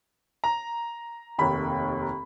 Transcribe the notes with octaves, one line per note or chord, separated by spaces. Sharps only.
A#5
F1 D#2 D#3 B5